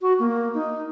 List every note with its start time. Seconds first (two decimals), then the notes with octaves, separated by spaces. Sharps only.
0.01 F#4
0.19 A#3
0.54 D#4